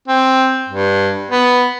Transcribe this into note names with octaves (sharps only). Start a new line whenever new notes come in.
C4
G2
B3